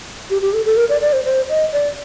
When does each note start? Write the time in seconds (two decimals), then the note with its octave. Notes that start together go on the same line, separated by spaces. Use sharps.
0.30 G4
0.42 G4
0.53 A4
0.66 A4
0.77 A#4
0.89 D5
1.01 D5
1.13 C5
1.25 C5
1.49 D#5
1.72 D5